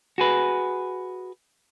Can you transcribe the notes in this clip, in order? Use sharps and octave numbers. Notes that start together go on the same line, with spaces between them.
F#4 G#4 B4